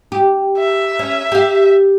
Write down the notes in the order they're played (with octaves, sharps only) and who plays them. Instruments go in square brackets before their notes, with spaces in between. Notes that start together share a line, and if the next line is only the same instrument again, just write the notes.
[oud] G4
[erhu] E5
[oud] C#4
G4 F5